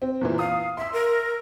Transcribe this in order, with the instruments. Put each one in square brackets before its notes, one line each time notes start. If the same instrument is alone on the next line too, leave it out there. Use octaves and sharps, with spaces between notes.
[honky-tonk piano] C4
E2 A#2 E3
[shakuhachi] F5 [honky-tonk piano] D#6
[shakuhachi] E5 [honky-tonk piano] C6 E6
[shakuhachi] A#4